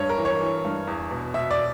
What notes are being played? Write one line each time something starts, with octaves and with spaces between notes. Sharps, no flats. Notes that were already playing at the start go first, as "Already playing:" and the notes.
Already playing: G2 C#5
A#4
E3
C#5
E3
G2
E2
B2
B2 E5
D5